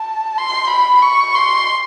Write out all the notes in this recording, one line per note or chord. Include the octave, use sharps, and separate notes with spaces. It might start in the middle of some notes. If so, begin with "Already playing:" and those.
Already playing: A5
C6
B5
C#6
C6